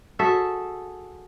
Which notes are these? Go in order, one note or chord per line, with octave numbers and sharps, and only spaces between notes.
F#4 G#4 A4 E5